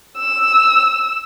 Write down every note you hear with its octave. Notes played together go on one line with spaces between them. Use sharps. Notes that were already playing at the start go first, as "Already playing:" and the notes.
E6